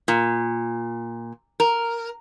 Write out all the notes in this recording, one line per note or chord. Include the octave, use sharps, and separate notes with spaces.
A#2
A#4